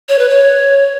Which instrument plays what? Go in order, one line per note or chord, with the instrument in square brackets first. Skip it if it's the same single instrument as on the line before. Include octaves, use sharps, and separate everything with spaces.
[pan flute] C#5
B4
C#5